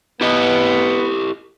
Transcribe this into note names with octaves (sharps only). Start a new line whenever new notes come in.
B3 E4 G4 D#5